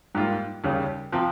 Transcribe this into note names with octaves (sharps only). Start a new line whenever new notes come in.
G#2 G3 A#3 F4
D#2 C#3 G3 C#4
C3 F3 C4